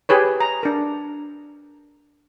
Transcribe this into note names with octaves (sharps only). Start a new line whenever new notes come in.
G4 G#4 B4 C#5
A#5
D4 A#4